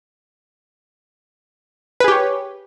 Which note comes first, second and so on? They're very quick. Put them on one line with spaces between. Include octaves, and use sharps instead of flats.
B4 G#4 G4 C#5